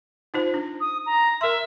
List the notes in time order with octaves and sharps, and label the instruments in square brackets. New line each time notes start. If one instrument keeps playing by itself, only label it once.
[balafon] D#4 F4 C5
D4
[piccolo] D#6
A#5
[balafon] A#4 C6 [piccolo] E5